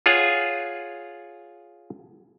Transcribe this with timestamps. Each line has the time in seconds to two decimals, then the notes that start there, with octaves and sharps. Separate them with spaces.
0.06 F4 G#4 C#5 F#5